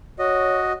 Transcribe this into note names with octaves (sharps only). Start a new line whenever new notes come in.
F#4 C#5 D#5